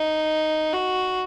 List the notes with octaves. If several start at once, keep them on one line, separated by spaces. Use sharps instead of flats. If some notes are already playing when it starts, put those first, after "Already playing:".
Already playing: D#4
F#4